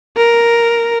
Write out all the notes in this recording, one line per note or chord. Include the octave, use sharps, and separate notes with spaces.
A#4